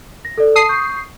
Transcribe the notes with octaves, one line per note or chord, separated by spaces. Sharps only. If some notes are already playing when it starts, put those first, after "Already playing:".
A#6
A4 D5
A5 D#6 C7
C#6 G6